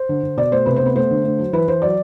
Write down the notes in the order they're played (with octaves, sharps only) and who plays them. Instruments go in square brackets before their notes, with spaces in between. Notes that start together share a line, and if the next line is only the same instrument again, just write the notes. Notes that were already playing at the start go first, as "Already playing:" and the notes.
Already playing: [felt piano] C5
D3
D3
B2 D5
A3 C5
C3 B4
C5
B3 B4
A3 C5
D3
A3
F#3
E3 B4
E3 C5
F#3 D5